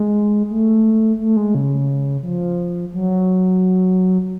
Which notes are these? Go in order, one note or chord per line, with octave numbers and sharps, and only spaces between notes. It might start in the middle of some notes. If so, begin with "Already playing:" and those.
Already playing: G#3
A3
A3
G#3
C#3
F3
F#3